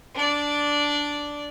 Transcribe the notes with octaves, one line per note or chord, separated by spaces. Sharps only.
D4 D5